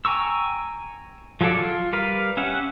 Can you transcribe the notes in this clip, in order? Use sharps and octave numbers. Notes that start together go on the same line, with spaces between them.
G5 G#5 A#5 C#6 E6
F3 F#3 G#4 A4 D5
F4
G3 A#4 B4 F5
C#4 G4 E5 F#5